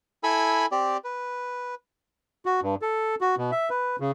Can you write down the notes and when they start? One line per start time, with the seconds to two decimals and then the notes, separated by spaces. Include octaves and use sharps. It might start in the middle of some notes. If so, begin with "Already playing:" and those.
0.23 E4 A4 G#5 B5 E6
0.72 C4 G4 D5
1.04 B4
2.46 F#4
2.62 G2
2.82 A4
3.21 F#4
3.37 B2
3.52 E5
3.70 B4
4.00 C#3